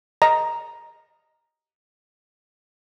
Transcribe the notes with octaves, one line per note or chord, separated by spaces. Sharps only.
D#5 A#5